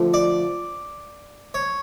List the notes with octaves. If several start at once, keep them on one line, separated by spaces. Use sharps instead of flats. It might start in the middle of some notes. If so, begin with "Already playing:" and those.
Already playing: D3 F3 A3
D5
C#5